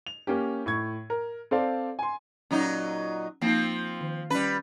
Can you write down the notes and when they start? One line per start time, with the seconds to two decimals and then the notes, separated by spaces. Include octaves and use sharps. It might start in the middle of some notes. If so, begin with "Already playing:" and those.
0.07 F7
0.27 A#3 C#4 G4
0.66 A2 C#6 G#6
1.10 A#4
1.51 C4 A4 C5 D5 F5
1.99 G#5 C6
2.51 A#2 F#3 C#4 D#4
3.41 F3 A#3 C4 D#4
4.01 D#3
4.30 G3 C#4 B4